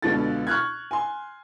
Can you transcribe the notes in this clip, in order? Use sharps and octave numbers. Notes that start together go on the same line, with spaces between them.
C#2 B2 D3 F4 A4 A6
C#6 F6 F#6 G#6
G#5 C6